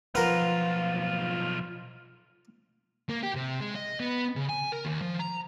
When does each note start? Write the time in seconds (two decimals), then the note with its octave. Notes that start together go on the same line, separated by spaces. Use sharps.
0.15 B1 F3 F4 A#4 B4 F#5
3.10 A#3
3.23 G4
3.35 C3
3.61 G#3
3.76 D#5
4.00 B3
4.36 C#3
4.49 G#5
4.72 A#4
4.85 D#2
5.02 F3
5.20 A#5